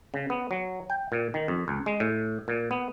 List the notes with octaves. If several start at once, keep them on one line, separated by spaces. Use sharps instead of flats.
C#3
B3
F#3
G5
A#2
D#3
F2
C#2
G#3
A2
A#2
B3